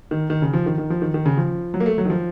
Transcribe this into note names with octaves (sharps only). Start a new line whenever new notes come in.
D#3
D#3
C#3
F3
D#3
D#3
F3
D#3
D#3
C#3
F3
F#3
A#3
A3
F#3
D#3
F3